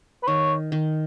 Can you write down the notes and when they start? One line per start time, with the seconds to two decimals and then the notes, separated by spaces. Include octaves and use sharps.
0.23 B4
0.27 D#3 C#5
0.72 D#3